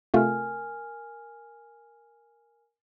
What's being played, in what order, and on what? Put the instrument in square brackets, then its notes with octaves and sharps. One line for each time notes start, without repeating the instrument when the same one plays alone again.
[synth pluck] C3 A3 F4 [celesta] A#4 G#5 F6